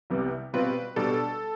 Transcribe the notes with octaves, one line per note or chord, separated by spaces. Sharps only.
C2 C3 G3 B3
B2 G3 C4 F4 B4
B2 G3 D4 A4